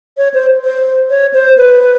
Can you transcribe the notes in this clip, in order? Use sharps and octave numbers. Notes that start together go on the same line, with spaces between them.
C#5
C5
C5
C#5
C5
B4